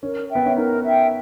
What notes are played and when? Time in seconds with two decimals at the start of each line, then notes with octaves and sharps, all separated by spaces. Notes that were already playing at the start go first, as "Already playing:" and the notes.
0.02 C#4 A#4
0.29 E5 G5
0.35 B3
0.46 C#4
0.57 D#4 A#4
0.85 E5 G5